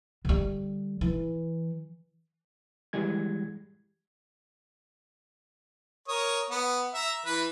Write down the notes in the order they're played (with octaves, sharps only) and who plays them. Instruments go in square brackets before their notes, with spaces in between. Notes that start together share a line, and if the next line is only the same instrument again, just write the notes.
[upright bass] D3 G3
E3
[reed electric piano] E3 G3 G#3 G#6
[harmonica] A#4 C#5 D#6
B3
E5 A#5
E3 B4